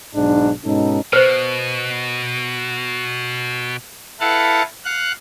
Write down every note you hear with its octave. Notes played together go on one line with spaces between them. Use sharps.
B1 G#2 D4
G#2 B2 C#4 D#4 A4
B2 B4 C5
E4 A4 B4 F5 F#5 A5
F5 F#5 F#6